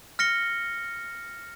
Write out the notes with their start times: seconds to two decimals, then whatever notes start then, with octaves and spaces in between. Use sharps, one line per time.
0.19 F6 A#6 C#7 G7